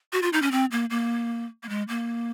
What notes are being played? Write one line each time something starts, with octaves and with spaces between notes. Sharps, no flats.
F#4
F4
D#4
C#4
C4
A#3
A#3
A#3
G#3
A#3